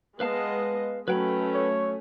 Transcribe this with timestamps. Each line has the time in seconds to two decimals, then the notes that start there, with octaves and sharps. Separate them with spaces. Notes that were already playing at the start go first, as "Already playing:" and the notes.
0.20 G#3 B3 B4 D#5 F5 A5
1.08 F#3 A3 C#4 B4 G5 B5
1.54 C#5